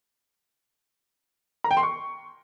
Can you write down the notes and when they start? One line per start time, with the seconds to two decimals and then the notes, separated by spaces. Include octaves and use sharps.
1.64 A#5
1.71 G5
1.77 C6
1.83 C#6